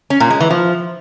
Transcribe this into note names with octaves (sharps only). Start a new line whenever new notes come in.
C#4
A#2
G#3
E3
F3